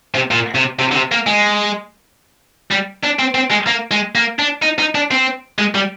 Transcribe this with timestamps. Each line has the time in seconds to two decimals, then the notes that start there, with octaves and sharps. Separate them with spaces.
0.15 C3
0.31 A#2
0.55 C3
0.79 C3
0.91 D3
0.95 C3
1.12 A#3
1.27 G#3
2.71 G3
3.03 D4
3.19 C4
3.35 C4
3.51 G#3
3.67 A#3
3.91 G#3
4.15 A#3
4.39 D4
4.62 D#4
4.79 D#4
4.95 D4
5.11 C4
5.59 G#3
5.75 G3